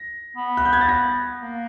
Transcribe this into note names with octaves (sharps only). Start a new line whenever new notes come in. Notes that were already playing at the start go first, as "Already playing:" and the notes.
Already playing: A#6
B3
F#6
G6
G#6
A6
A#6
A#3